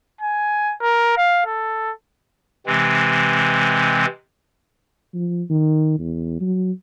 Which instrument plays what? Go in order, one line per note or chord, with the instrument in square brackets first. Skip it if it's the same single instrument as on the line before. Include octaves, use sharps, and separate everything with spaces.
[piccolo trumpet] G#5
A#4
F5
A4
[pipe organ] C3 E3 G#3 C4
[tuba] F3
D#3
E2
F#3